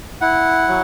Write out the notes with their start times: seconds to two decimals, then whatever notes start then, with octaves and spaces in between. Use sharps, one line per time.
0.21 E4 F#5
0.68 F#3